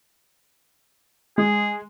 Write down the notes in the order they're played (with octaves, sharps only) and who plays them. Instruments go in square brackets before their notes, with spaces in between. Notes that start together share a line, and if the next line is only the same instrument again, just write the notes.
[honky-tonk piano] G#3 [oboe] G#4